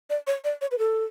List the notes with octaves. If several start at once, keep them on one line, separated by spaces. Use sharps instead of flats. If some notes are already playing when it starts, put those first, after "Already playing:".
D5
C#5
D5
C#5
B4
A4